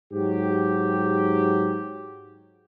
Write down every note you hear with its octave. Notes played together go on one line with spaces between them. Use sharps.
G#2 F#3 G4